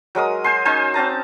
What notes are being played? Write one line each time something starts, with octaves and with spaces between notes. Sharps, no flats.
F#3 G#3 A#4 D#6
C5 G#5 C6
C#4 D#4 C5 G#5
C4 C#4 A5 A#5